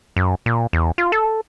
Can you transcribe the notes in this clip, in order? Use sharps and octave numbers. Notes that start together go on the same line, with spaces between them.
F#2
A#2
E2
F4
A4